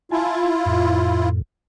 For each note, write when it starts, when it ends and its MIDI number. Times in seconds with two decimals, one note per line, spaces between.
0.11 1.29 64
0.11 1.29 65
0.11 0.50 80
0.11 0.50 81
0.65 1.42 41
0.65 1.42 45